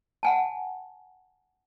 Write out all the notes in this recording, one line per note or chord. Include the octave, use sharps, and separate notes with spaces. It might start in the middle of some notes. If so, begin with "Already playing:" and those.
F#5 G#5 A5